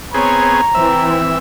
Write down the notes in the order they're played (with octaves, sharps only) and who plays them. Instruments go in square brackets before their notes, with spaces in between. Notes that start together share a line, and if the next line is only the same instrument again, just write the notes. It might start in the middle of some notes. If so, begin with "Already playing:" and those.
[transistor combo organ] B3 C4 G#4 [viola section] C#5 [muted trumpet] A#5
[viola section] E3 C4 [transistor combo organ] E5